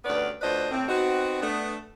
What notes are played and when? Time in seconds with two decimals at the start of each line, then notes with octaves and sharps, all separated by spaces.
0.05 D2 G2 B3 C#4 B4 D5
0.41 D2 F3 B4 C5 D5 D#5
0.71 A2 C4
0.88 B3 C4 D#4 F#4
1.41 A3 B3 D4